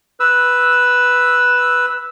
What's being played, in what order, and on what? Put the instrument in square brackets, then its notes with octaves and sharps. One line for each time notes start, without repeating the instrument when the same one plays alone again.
[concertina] B4 E6